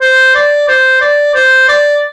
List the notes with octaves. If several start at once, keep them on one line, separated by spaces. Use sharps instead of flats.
C5
D5
C5
D5
C5
D5